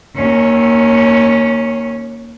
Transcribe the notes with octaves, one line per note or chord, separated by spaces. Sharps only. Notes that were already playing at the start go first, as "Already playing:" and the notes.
D#2 C#4